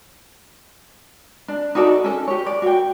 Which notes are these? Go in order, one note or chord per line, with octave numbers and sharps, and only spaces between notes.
D4
D#4 F#4 A4 D5
C#4 A4
G4 C#5
D5
F#4 G5